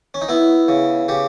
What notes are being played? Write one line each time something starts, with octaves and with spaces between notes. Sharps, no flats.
C#4
D#4
B3 E4
C#3
C#3 G4